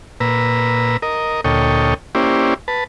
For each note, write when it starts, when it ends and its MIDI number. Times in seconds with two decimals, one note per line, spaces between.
0.20 0.97 46
0.20 0.97 71
0.20 0.97 82
0.20 0.97 88
1.02 1.41 70
1.02 1.41 75
1.44 1.94 38
1.44 1.94 46
1.44 1.94 69
1.44 1.94 73
1.44 1.94 75
1.44 1.94 79
2.15 2.54 58
2.15 2.54 61
2.15 2.54 64
2.15 2.54 67
2.15 2.54 72
2.15 2.54 74
2.68 2.84 71
2.68 2.84 81